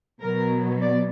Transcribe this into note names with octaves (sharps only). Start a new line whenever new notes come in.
B2 F#3 B3 A#4
D5